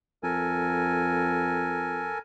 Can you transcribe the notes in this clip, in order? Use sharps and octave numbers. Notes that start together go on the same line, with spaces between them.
F2 A4 A#4 G#5